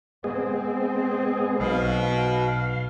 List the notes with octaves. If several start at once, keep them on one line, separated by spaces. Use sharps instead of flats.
G#3 B3 C4 G#4
B1 B2 F5